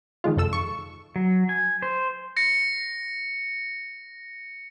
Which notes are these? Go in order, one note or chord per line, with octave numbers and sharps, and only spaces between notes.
D#3 F3 G#3 F4
C2 F2 A4 E6
C#6
F#3
G#5
C5
A#6 C#7